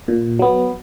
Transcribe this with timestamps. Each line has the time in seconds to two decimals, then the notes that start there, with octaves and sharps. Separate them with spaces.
0.08 A#2
0.39 F#3 B3